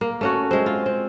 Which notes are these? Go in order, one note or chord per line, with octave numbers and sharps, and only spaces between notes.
A#3
A3 C#4 F#4
G#3 C4
F4
C4